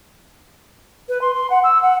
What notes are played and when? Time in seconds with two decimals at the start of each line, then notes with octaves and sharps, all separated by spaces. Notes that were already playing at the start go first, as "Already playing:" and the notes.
1.09 B4
1.21 C6
1.34 C6
1.50 F#5
1.63 E6
1.82 F#5